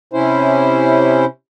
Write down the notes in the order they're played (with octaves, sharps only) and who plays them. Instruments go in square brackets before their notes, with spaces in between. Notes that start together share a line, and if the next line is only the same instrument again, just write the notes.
[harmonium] C3 C#4 E4 C5